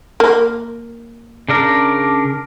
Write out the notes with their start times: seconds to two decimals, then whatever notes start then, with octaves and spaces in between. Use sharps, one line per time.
0.20 A#3
1.48 C#3 D4 A#4